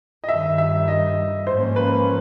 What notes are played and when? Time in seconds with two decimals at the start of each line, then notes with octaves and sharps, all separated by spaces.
0.24 D#5
0.29 G2 D#3 G3 E5
0.58 E5
0.88 D#5
1.47 G#2 F3 A#3 C#4 C5
1.76 B4